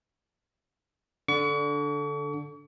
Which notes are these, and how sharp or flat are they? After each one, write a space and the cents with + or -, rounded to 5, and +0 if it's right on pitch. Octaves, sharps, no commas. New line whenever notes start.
D3 -10 D4 +0 C#6 +40